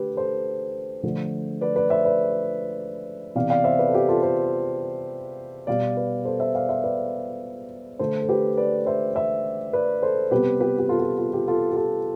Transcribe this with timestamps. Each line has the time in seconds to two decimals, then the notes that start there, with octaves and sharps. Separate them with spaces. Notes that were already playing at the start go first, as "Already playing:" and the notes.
Already playing: D3 A3 G4 B4
0.17 A4 C5
1.03 D3 F3 A3
1.61 B4 D5
1.76 B4 D5
1.90 C5 E5
2.05 B4 D5
3.35 C3 E3 B3 D5 F5
3.50 D5 F5
3.64 C5 E5
3.79 B4 D5
3.88 A4
3.94 G4
4.09 F4 A4
4.22 A4 C5
5.67 B2 G3 B3 D5 F5
5.97 B4 D5
6.25 A4 C5
6.40 C5 E5
6.55 D5 F5
6.69 C5 E5
6.83 B4 D5
7.99 D3 A3 A4 C5
8.22 A4
8.29 G4 B4
8.57 B4 D5
8.86 C5 E5
9.15 C5 E5
9.73 B4 D5
10.02 A4 C5
10.31 C3 G3 B3 G4 B4
10.60 G4 B4
10.79 G4
10.89 F4 A4
11.00 F4
11.03 G4
11.18 F4
11.33 G4
11.48 F4 A4
11.71 G4
11.76 F4 A4